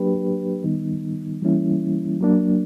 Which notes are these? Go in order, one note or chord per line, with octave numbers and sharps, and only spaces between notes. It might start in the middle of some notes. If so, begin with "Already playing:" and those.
Already playing: F#3 A#3 D4 G4 B4
D#3 G3 B3 D#4
E3 G3 A#3 C#4 E4
F#3 A#3 D4